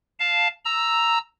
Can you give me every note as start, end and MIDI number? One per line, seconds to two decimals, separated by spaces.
0.19 0.48 77
0.19 0.48 81
0.65 1.18 82
0.65 1.18 88